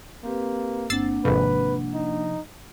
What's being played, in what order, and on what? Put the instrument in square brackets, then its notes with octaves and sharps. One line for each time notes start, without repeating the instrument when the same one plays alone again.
[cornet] A#3 [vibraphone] C4 G4 B4
[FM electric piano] G1 C4 [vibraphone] A#3 D4 F#5 [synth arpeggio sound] E6 A6 C7
[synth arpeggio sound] G#1 F2 [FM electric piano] C3 F3 [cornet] B4
[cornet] D#4